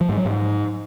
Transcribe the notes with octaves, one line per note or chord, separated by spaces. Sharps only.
F3
G#2
F#3
G#2